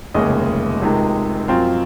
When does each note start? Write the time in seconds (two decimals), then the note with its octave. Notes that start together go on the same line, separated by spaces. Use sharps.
0.14 F1 D#2 C#3 G#3 D#5
0.82 C#2 C3 D#3 G#3
1.48 F#2 F3 C4 F4